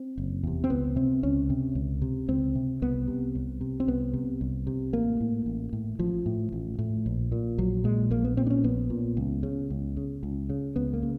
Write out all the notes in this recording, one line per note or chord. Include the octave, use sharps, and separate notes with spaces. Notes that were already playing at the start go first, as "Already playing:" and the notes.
Already playing: C4
F#1
E2 C3
C4
C#2 B3
C3 C4
C#2 C#4
C3
C#2
C3
C#2 C4
C3
C2 B3
C3
C2
C3
C4
C2 B3
C3
C2
C3
A1 A#3
A2
A1
A2
A1 F3
A2
A1
A2
A#1
A#2
A#1 F#3
A#2 G#3
A#1 A#3
B3
A#2 C4
D4
C#4
A#1 B3
A#2
C#2
C#3
C#2
C#3
C#2
C#3
C#2 B3
A#3
C#3